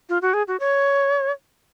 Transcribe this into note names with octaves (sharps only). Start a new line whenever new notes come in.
F4
F#4
G#4
F#4
C#5